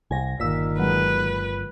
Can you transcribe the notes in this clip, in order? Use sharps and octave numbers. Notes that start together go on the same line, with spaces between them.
C2 G#5 A#6
G1 A#2 D#3 E6 B6
F#3 G#3 B4